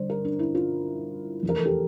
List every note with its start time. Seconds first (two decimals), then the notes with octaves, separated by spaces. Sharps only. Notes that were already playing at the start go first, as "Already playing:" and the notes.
Already playing: G1 G2 D3 C5 D5
0.10 A#4
0.25 D4
0.39 E4
0.55 F4
1.43 F1 E2 E3
1.49 A#4
1.57 A4
1.65 G4